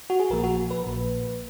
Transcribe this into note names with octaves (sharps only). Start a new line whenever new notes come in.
F#4
G#4
A#1 A#2 F3 A#3 A#4
F#4
B4
A#1 A#2 F3 A#3